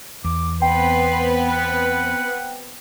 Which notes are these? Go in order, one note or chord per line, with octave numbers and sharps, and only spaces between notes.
E2 D6
B3 C4 B4 G5 C6
F#5